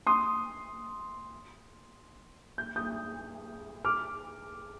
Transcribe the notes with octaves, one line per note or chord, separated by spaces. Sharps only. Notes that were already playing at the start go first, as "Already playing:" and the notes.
C6 D#6
G6
D#6 G6
D6 F6